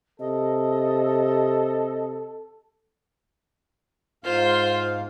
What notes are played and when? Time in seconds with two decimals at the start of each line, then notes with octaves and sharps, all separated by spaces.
0.20 C3 A4 D#5
4.24 G#2 F4 C5 F5